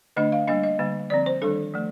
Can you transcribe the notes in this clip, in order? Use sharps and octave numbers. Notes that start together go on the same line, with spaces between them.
D3 A3 D4 D#5
F5
G3 A#3 D4 D#5
D#5
D3 G3 A#3
D3 F3 C4 D5
C5
D#3 G3 D4 A4
F3 A3